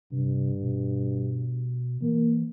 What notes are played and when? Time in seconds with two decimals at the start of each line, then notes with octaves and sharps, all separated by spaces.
0.12 G2 C3
0.62 B2
2.02 E3 A#3